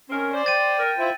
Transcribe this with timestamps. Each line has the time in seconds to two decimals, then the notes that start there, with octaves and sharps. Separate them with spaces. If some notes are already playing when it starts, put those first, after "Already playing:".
0.09 D#3 C4 C#4 A#4
0.33 C5 D5
0.46 G5 A6 D#7
0.78 A#4
0.98 E4 F4 C5